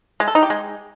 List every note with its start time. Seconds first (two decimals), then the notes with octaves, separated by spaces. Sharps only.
0.20 G#3
0.28 A4
0.35 D#4
0.43 G4
0.50 G#3